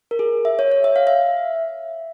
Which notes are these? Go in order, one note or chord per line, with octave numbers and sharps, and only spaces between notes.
A#4
G#4
E5
C#5
C#5
E5
F5
E5